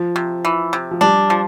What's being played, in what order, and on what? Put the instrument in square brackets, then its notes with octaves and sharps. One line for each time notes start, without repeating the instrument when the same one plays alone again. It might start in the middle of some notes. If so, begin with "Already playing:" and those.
Already playing: [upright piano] F3
[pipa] C3
E3
C3
[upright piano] F3
[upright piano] G3 [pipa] D4
[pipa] F3